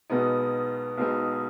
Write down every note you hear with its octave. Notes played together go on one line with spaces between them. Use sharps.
B1 B2 G#3 B3 D#4
B1 B2 G#3 B3 D#4